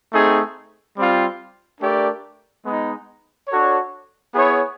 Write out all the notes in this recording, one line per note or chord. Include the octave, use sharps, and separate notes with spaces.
A3 C4 D#4 G#4
G3 C4 F4
A3 D4 G4 A#4 D5
G#3 B3 D#4
D4 F#4 A4 C#5
B3 E4 G#4 C#5